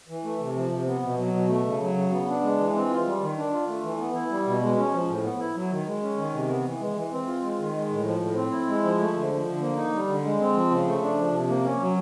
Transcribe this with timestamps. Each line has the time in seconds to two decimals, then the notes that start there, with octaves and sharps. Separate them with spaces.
0.08 E3
0.24 A3
0.40 C3
0.56 F3
0.70 C3
0.86 B3
1.02 B2
1.18 F#3
1.33 B2
1.48 A3
1.65 C#3
1.80 F#3
1.96 C#3
2.11 B3
2.28 D4
2.42 G#3
2.59 E3
2.74 C4
2.89 F4
3.05 G3
3.20 D#3
3.37 D4
3.52 F4
3.68 A3
3.83 E3
3.98 B3
4.14 E4
4.30 G3
4.46 B2
4.61 G#3
4.77 C#4
4.93 F3
5.08 A2
5.24 B3
5.39 E4
5.55 F#3
5.70 D#3
5.86 G#3
6.02 C#4
6.18 D#3
6.33 C3
6.48 B3
6.65 E3
6.80 G#3
6.95 E3
7.11 C4
7.27 F4
7.42 G#3
7.59 D#3
7.73 G#3
7.90 A2
8.05 F3
8.20 A2
8.35 C4
8.51 E4
8.67 G#3
8.83 F3
8.99 A3
9.14 D3
9.29 F3
9.46 D3
9.61 A#3
9.76 D#4
9.93 G3
10.08 D3
10.24 G#3
10.39 C4
10.54 F3
10.71 C#3
10.86 A3
11.02 D4
11.17 F3
11.32 C3
11.48 A#3
11.64 C#4
11.80 F#3